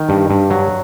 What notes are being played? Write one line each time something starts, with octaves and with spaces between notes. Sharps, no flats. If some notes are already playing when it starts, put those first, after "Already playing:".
Already playing: D#3
G2
G2
F#3